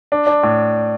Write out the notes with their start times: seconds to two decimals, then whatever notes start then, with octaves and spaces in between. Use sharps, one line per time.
0.12 D4
0.27 D4
0.43 A2